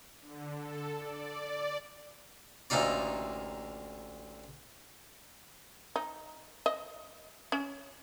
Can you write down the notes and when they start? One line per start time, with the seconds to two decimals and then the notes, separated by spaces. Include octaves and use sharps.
0.21 D3
0.56 A4
0.98 D5
2.70 A1 D2 A#3 D#4 F4 D5
5.96 D#4
6.66 D#5
7.52 C#4